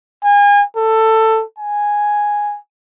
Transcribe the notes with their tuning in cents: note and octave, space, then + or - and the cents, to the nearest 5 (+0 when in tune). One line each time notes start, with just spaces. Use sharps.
G#5 -35
A4 +15
G#5 -5